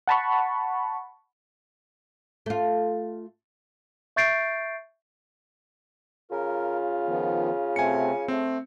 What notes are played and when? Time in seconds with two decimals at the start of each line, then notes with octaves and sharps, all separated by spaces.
0.08 F#5 A5 B5 C#6
2.46 A3 F4
4.16 E5 C#6 G6 A6 C7 D7
6.32 C#3 F4 A#4
7.07 D#3 F3 B3
7.76 C3 A3 C4 G#5 C#7
8.28 A3 C4